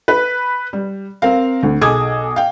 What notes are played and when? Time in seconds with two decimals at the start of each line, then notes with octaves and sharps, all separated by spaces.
0.08 B4
0.73 G3
1.22 C4 A#4 F5
1.63 D2
1.81 B1 G#4 A4 D6 D#6 G#6
2.36 F5 G5